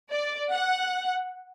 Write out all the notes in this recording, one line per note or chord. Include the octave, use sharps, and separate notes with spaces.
D5
F#5